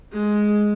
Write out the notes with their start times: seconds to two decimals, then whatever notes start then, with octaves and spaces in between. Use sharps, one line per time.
0.12 G#3